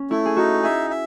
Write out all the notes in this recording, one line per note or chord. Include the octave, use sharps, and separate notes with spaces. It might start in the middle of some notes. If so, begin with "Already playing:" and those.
Already playing: C#4
A3 E4
G#4
D#4 F#4
G#4 E5
E5